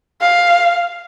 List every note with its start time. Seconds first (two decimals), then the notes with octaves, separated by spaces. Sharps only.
0.21 F5